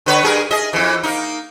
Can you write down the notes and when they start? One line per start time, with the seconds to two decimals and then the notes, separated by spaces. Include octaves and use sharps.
0.06 D3 B4 C#5
0.23 G2 G#4 A#4
0.51 G#4 D#5
0.73 F2 E3
1.03 A#3 D#4